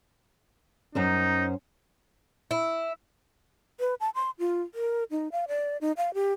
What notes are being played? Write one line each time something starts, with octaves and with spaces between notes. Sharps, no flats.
F#2 C#4 D#4 C5
E4
B4
A5
C6
F4
A#4
D#4
F5
D5
D#4
F5
G4